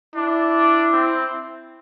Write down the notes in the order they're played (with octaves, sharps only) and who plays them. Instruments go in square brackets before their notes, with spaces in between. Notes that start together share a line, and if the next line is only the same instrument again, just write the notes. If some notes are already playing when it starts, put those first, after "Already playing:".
[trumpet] D4 [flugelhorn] E4
[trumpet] C4